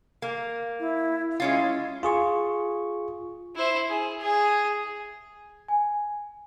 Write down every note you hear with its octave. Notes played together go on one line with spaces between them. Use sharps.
A#3
E4
G#3 C#4 E4 F4
F4 G#4 C#6
E4 C5
G#4
G#4
G#5